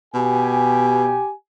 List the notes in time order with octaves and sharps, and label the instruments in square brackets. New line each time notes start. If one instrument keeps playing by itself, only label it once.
[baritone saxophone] B2 [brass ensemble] G4 G#5